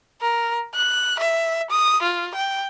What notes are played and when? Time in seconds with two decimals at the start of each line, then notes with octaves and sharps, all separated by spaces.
0.21 A#4
0.74 F#6
1.19 E5
1.70 D#6
2.02 F4
2.35 G5